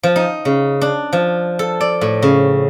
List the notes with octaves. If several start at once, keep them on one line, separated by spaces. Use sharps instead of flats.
F3
D#4
C#3
D4
F3
A4
D5
A2
C#3